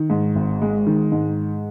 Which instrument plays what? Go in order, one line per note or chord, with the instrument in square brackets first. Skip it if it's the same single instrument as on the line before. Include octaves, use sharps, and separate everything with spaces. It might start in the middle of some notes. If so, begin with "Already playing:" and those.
Already playing: [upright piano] D#3
G#2
G#1
G#3
D#3
G#2